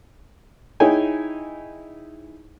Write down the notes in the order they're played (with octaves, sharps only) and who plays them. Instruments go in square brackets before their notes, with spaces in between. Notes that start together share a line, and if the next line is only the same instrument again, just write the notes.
[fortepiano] D#4 E4 G#4 C#5 G5 G#5